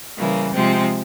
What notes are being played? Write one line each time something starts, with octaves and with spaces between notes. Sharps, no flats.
C#3 E3 G3 A#3
C3 F3 G#3 C4